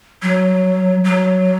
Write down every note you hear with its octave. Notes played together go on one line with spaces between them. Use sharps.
F#3
F#3